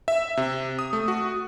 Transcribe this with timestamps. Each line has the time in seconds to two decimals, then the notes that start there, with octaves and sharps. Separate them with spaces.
0.08 E5
0.37 C3
0.79 D#6
0.93 A3
1.08 F#4